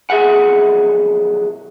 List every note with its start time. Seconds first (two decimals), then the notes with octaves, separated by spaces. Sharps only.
0.10 B1 F2 G#4 E5 F#5